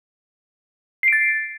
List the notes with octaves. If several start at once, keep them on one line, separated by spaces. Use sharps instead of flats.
A6 C7 D7